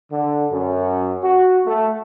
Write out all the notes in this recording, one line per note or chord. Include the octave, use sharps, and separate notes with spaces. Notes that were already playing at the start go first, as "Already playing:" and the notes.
D3
F#2
F#4
A3